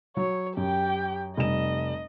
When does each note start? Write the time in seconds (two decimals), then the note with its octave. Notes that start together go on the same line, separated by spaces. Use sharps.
0.17 F#3 C#5
0.57 F#2 G4 G5
1.37 F1 G3 D#5 E7